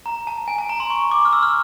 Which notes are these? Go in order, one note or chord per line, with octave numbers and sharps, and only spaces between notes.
A#5
A5
G#5
A5
A#5
C6
C#6
D6
F6
E6
F6